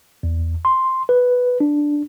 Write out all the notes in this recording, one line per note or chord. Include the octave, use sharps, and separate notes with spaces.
E2
C6
B4
D4